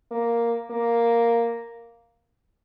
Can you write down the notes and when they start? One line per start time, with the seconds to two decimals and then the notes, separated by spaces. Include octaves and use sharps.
0.11 A#3
0.71 A#3